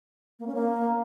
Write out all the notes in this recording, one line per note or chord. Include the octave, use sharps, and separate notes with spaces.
A#3
C#4
A#3